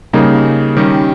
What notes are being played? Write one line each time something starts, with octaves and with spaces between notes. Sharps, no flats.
C#3 G3 A#3 D#4 G#4
D#3 G3 C#4 G4 A#4